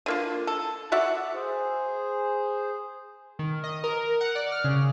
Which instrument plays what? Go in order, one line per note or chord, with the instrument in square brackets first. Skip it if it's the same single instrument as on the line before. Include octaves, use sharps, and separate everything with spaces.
[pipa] D3 A#3 F4
A4
F#4 D5 E5 F#5
[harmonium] G#4 C5
[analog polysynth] D#3
D#5
A#4
F#5
D5
F6
C#3